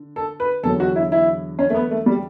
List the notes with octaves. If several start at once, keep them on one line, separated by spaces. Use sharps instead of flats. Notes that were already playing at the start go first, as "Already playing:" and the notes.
Already playing: D3
A4
B4
E2 D3 F#3 A4
F#4
E4
E4
C#4
A3
B3
A3
G3